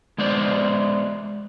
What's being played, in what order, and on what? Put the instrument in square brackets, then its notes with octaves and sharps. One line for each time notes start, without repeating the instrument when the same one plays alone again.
[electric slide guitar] G#3 B3 C5 D5